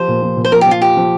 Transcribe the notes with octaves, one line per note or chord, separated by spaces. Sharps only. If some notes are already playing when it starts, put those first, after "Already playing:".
Already playing: F3 G4 C5
A#2
F3
A#2
C5
F3 A#4
G4
F3 F4
F4 G4
F3